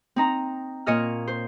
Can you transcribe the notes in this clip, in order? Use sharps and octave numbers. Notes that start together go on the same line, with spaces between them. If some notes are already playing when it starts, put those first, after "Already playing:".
C4 D#4 A#5
A#2 C#5 D#5 F6
C5